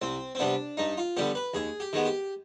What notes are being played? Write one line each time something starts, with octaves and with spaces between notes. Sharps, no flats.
C2 C4
C4
C3 G3 B3 D4
G2 D#4
F4
D3 G3 B3 G4
B4
D#2 G#4
G4
D#3 G#3 B3
G4